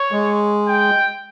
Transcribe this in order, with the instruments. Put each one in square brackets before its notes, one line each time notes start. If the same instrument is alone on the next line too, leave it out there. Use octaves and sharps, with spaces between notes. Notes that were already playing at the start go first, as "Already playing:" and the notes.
Already playing: [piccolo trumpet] C#5
[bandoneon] G#3
[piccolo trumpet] G5